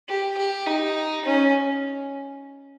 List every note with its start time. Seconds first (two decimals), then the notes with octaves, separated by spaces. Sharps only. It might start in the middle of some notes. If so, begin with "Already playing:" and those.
0.09 G4
0.37 G4
0.67 D#4
1.25 C#4